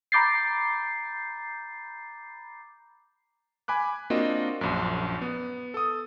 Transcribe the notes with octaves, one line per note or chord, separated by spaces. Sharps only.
A#5 B5 D6 G6 A6 C7
G#5 B5 D6 F#6
A#3 C4 D4 F4 F#4 D#5
A#1 F#2
B3
A4 D#6